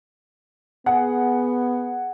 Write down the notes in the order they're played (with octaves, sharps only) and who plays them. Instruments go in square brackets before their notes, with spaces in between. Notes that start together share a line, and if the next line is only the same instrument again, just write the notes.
[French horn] B3 [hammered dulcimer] G#4 [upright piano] F#5